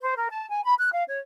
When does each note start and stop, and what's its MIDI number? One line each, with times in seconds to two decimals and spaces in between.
0.01 0.15 72
0.17 0.29 70
0.29 0.49 81
0.49 0.64 80
0.64 0.73 83
0.79 0.90 90
0.93 1.05 77
1.09 1.19 73